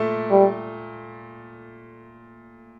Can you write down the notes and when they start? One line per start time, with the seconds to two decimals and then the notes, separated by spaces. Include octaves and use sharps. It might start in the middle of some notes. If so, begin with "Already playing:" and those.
Already playing: A#2 A3
0.31 G3